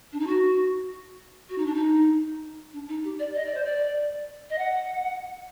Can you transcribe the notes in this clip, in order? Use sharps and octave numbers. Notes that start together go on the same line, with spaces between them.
D4
D#4
F#4
F#4
D#4
D4
D#4
D4
D#4
G4
D5
D#5
D5
C5
D5
D#5
F#5